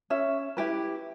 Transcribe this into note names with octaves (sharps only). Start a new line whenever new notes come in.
C#4 E5
E4 G4 B4